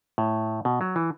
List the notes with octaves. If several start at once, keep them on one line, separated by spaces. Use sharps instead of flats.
A2
B2
F#3
E3